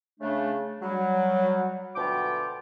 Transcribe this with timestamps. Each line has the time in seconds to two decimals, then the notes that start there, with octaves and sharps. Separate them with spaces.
0.20 C#3 A3 D4
0.81 F#3 G3
1.95 D2 B2 F4 G5 D6